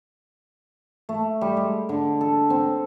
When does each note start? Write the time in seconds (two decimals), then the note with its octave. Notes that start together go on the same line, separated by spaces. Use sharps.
1.09 A3
1.41 G3
1.57 G#3
1.89 D3
2.21 A4
2.50 C4